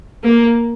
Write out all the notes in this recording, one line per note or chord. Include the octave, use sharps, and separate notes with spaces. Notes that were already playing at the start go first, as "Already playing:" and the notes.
A#3